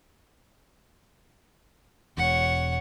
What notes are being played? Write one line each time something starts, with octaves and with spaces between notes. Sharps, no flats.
E1 C#5 F#5